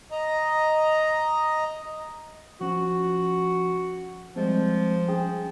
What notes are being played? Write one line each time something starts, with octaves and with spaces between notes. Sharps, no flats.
D#5 A#5
F3 C#4 F#4
F3 G3 G#3 C4
C#4 G#4 G5